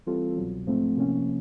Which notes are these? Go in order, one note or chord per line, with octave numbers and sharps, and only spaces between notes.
E3 G3 C4 F4 A4
C2 B2 F#3
G#2 F3 A3 C4
C3 F3 A#3 C#4